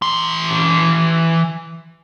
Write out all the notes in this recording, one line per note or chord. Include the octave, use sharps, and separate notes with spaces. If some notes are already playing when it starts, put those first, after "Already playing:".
E3 C6